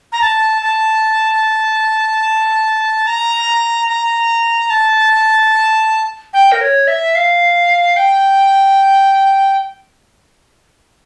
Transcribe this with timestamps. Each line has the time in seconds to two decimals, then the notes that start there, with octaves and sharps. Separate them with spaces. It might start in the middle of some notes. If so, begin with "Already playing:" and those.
0.12 A#5
0.21 A5
0.62 A5
3.07 A#5
3.88 A#5
4.70 A5
6.33 G5
6.52 A#4
6.61 C#5
6.87 E5
7.15 F5
7.96 G5